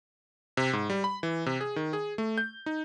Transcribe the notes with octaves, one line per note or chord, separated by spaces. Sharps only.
C3
G#2
G3
B5
E3
C3
G#4
D#3
G#4
A3
G6
D#4